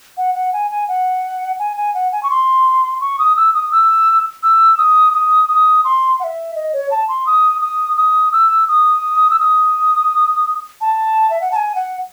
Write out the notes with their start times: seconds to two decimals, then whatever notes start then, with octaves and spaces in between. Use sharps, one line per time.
0.17 F#5
0.35 F#5
0.53 G#5
0.71 G#5
0.88 F#5
1.59 G#5
1.77 G#5
1.94 F#5
2.12 G#5
2.23 C#6
2.30 C6
3.01 C#6
3.19 D#6
3.36 E6
3.54 D#6
3.72 E6
4.43 E6
4.78 D#6
5.13 D#6
5.49 D#6
5.84 C6
6.19 F#5
6.24 E5
6.55 D#5
6.73 C#5
6.91 A5
7.08 C6
7.26 D#6
7.61 D#6
7.97 D#6
8.33 E6
8.68 D#6
9.30 E6
9.39 D#6
10.81 A5
11.30 E5
11.41 F#5
11.51 A5
11.56 G#5
11.75 F#5